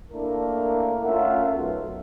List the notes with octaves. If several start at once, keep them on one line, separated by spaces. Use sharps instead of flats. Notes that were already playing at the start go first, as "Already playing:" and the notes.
A3 A#3 D4 E4 A#4
A3 C#4 F4 A#4 E5 F#5
B1